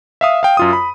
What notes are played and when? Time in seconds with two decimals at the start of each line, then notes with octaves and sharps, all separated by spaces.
0.21 E5 F5 D#6
0.43 F5 G5
0.57 F#2 F4 D#6
0.73 B5